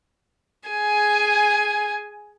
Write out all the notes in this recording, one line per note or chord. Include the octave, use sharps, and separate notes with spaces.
G#4 G#5